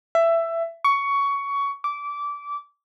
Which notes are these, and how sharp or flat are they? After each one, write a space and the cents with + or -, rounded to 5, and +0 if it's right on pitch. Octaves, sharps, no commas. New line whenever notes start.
E5 +15
C#6 +15
D6 -20